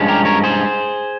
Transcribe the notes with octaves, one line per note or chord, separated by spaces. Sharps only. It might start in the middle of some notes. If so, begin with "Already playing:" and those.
Already playing: G2 F3 G#3 C#4
G4 A#4
A#4 C#5
G#4 C5